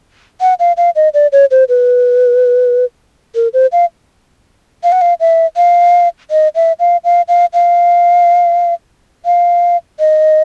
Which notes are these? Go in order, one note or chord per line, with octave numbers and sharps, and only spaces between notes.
F#5
F5
F5
D#5
D5
C#5
C5
B4
A#4
C5
F5
F5
F#5
F5
E5
F5
D#5
E5
F5
F5
F5
F5
F5
D#5